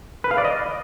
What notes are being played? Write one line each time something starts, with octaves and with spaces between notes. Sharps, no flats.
B4
F5
D5
D#5